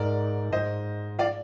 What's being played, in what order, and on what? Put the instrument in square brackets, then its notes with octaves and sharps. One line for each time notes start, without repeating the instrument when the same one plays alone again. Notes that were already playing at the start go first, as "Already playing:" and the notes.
Already playing: [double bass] G#2 [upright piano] A#4 D5
[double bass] G#2 [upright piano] C5 D#5
[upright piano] D5 F5